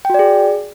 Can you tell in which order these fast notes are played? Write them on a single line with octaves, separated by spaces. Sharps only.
G5 F#4 D5 G#4